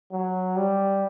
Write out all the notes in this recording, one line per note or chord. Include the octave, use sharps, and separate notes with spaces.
F#3
G3